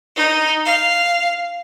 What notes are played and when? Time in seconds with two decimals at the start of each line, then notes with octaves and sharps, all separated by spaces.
0.17 D#4
0.66 F5